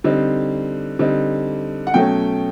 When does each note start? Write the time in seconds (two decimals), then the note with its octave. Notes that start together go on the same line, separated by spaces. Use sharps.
0.04 D3 G3 C4 D#4
0.99 D3 G3 C4 D#4
1.87 F#5
1.94 B2 F#3 A3 C#4 G5